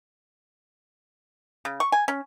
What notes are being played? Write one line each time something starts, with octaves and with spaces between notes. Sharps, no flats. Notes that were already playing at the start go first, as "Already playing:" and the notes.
C#3
C#6
G#5
C#4